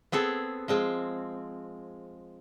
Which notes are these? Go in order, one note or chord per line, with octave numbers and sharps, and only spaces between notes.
B3 C4 G#4 A4
F3 G#3 C4